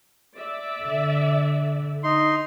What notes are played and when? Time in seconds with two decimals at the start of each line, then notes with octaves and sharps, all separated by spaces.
0.36 D5 E5
0.83 D3
2.04 D#4 C6